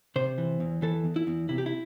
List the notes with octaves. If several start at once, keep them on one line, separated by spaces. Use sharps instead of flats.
C3 C5
E3
E2
E3 A4
E2
E4
E2
C3 E4
G4
E4